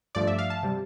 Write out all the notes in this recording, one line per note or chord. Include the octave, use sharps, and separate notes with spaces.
G2 F3 A3 D5
E5
F5
A5
C3 G3